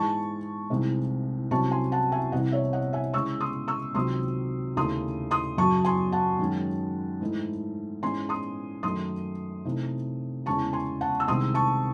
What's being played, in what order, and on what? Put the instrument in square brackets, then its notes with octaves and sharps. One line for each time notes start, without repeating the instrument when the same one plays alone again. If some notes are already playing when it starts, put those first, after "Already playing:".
Already playing: [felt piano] G#2 E3 G#3 A5 C#6
C2 C3 E3 G#3 D#4
C2 C3 F#3 C#4 A5 C#6
G#5 C6
F#5 A5
E5 G#5
C2 C3 E3 D#5 F#5
C#5 E5
D#5 F#5
E5 G#5
C#3 G#3 C#4 E4 C#6 E6
C6 D#6
C#6 E6
C#2 C3 D#3 F#3 C6 D#6
D#2 C#3 E3 A3 D#4 C6 D#6
C6 D#6
F#2 C#3 F#3 A5 C#6
G#5 C6
F#5 A5
F#2 D#3 G#3 C#4
G#2 E3 A3 D#4
G#2 E3 G#3 C#4 G#5 C6
C6 D#6
F#2 D#3 A3 D#4 C6 D#6
C3 E3 A3 D#4
E2 C#3 G#3 C#4 E4 A5 C#6
G#5 C6
F#5 A5
E6
C2 C3 D#3 G#3 C6 D#6
A5 C#6